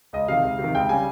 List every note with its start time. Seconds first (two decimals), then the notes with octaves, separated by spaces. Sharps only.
0.13 C#2 D#5
0.28 C3 D#3 F5
0.43 C#2
0.59 C3
0.64 D#3
0.75 C#2 G5
0.89 C#3 G3 G#5